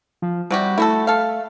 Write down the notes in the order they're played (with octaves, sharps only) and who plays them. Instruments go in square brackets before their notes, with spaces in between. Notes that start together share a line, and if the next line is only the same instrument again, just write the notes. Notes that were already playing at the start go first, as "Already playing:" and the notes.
[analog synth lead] F3
[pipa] C3 F#4 G4 [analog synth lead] G3
[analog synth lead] A3 [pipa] E4 F#4 A4
[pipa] A4 F5